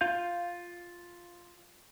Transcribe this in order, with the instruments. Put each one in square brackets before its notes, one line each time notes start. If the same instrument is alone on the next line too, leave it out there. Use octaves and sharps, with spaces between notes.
[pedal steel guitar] F4 F5 G6